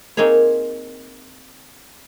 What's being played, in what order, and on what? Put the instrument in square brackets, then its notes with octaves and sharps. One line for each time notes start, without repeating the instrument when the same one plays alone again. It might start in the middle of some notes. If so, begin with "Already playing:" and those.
[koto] A#3 C4 D#4 G#4 C#5